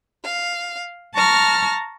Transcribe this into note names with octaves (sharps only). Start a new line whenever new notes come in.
F5
A5 A#5 C#6 F6 A#6